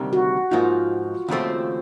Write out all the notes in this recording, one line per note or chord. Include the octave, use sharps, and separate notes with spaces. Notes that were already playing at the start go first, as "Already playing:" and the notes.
Already playing: D2 C3 D#3 G3 A#3
F#4
G#2 F3 A#3 D#4 F4
D#2 C#3 F3 A3 C4